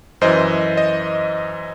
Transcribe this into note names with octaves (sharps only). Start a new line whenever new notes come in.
F#2 E3 C5 D#5
D#5